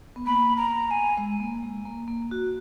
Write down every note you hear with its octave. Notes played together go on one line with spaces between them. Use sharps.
B3
A#3 B5
A#5
A#5
G#5
G#3
A#3
G#3
A#3
A#3
F#4